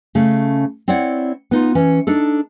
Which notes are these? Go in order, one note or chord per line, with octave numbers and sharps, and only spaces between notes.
C#3 A3 C#4
C4 E4 C#5 D5 F#5
B3 D#4 F4
E3 C#4
D4 D#4 A4